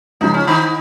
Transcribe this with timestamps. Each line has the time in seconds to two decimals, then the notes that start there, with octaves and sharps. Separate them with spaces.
0.21 C#2 C#3 F3 G#3 D#4
0.34 C#4
0.47 D#3 D#4